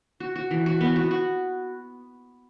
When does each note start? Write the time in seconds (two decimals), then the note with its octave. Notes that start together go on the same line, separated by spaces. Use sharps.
0.20 F#4
0.36 F#4
0.51 E3
0.66 F#4
0.81 B3
0.96 F#4
1.11 F#4